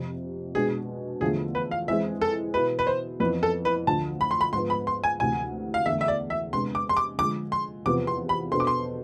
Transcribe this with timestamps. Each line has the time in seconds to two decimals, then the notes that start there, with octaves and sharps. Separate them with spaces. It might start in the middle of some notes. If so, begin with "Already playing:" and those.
Already playing: F2 C3 F3
0.55 B2 G#3 D4 G#4
1.21 E2 D3 F3 A3 G#4
1.55 B4
1.71 F5
1.88 E3 G#3 C4 G#4 E5
2.21 A4
2.54 B2 B3 E4 B4
2.79 B4
2.87 C5
3.20 F2 E3 B3 B4
3.43 A4
3.65 B4
3.86 D2 D3 F3 A5
4.21 B5
4.31 C6
4.41 B5
4.53 G#2 C6
4.56 F3 B3
4.70 B5
4.87 C6
5.04 G#5
5.20 D2 C3 E3 G#5
5.74 F5
5.86 E2 D3 A3 E5
6.01 E5
6.08 D5
6.30 E5
6.53 C3 G#3 B3 D4 C6
6.75 D6
6.89 C6
6.97 D6
7.18 D3 F3 G#3 D6
7.52 C6
7.86 E2 C3 F3 B3 D6
8.07 C6
8.29 B5
8.51 B2 B3 D4 A4 C5 C6
8.60 D6
8.67 C6